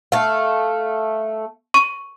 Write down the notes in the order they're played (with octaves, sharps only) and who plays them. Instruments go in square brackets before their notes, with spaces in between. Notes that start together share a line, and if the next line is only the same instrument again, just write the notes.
[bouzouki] A3 F5
[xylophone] C#6 D#7